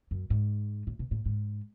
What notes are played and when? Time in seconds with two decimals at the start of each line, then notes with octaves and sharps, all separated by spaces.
0.11 F#2
0.30 G#2
0.87 A2
0.99 B2
1.11 A2
1.26 G#2